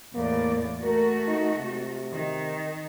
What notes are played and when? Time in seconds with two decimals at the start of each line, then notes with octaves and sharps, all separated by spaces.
0.15 E2 A2 A#3 D5
0.84 A3 F#4 A#4
1.28 D#4
1.59 C3
2.13 D#3